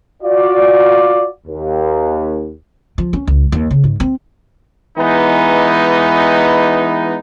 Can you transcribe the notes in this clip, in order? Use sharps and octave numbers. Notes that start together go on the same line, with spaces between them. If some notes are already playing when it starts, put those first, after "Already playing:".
F4 F#4 D5
D#2
F3
C#4
C#2
D#2
C#3
G#2
C4
E3 G#3 B3 D#4